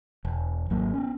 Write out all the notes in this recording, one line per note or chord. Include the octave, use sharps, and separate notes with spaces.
E1
G#1 F#3 A#3
B3 C#4